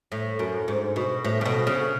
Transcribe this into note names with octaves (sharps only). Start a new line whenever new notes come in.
A2
F#2
G#2
B2
A2
C#3
B2
C#3